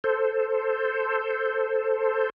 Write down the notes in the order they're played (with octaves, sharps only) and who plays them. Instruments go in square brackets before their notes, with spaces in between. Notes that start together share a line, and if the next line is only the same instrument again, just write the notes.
[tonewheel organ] A4 C5